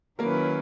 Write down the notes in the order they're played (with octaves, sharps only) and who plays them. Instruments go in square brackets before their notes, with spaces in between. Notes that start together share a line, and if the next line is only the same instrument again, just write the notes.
[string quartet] D#3 F#3 C#4 E4 B4 [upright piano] A#3 A#4